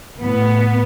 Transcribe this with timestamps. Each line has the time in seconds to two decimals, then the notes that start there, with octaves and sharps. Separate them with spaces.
0.20 A2 B3